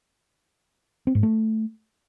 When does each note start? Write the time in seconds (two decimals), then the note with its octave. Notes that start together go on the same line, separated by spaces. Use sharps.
1.07 C4
1.15 G#2
1.23 A3